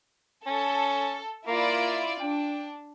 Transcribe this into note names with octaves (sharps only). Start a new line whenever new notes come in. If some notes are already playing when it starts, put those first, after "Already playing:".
C#4 A4
A#3 E4 F4 D5
D4 G5